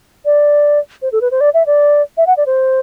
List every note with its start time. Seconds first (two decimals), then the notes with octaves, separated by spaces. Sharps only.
0.25 D5
1.02 C5
1.12 A4
1.21 B4
1.31 C5
1.41 D5
1.54 E5
1.66 D5
2.17 E5
2.27 F#5
2.37 D5
2.46 C5